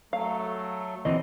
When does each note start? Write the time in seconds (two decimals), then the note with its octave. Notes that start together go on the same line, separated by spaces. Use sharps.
0.13 F#3 A3 F5
1.05 D2 E3 C4 D#5